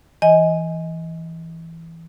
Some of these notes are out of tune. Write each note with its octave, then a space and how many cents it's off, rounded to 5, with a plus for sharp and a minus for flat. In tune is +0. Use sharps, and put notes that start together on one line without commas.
E3 +0 D#5 +20 G#5 +0